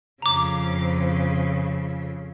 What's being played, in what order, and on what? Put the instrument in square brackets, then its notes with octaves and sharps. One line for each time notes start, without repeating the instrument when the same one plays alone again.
[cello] F2 C#3 [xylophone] A#5 D6